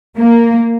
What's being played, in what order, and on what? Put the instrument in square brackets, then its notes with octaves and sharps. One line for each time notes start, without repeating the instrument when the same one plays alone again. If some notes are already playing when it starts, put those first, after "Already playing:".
[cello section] A#3